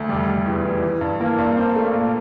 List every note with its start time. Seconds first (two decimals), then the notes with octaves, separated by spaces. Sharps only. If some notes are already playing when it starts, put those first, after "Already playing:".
Already playing: D2
0.09 F1 G3
0.28 F1
0.46 E2
0.65 E3
0.83 E3
1.01 G2
1.20 E3 A#3
1.38 G2
1.56 C4
1.75 A3
1.94 A#2